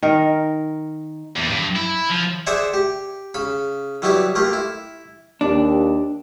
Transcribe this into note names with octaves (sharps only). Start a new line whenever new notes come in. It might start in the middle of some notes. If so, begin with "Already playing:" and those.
D#3 A#4
E2
G2
E4
F3
G#4 C5 D5 E5 F#5 G#5
G4
C#3 B5
E3 F#3 G3 B3 E4
A3 A#3 F4 G4
E4
D#2 D4 G4